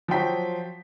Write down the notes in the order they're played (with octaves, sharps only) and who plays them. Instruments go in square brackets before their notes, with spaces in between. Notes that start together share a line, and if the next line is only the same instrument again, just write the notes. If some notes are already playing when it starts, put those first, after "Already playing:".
[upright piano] F3 F#3 C5 G5 B6